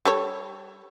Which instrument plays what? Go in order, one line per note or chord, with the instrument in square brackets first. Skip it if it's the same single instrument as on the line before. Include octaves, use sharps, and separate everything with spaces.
[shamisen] G3 A4 C#5